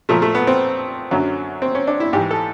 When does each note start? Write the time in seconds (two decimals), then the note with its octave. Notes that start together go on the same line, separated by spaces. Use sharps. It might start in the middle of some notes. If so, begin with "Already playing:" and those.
0.09 A#2 F3 A3
0.22 A3
0.35 B3
0.47 C4
1.11 F#2 D3 F#3
1.62 C4
1.75 C#4
1.87 D4
2.00 E4
2.13 G#2 G4
2.17 E3
2.31 A4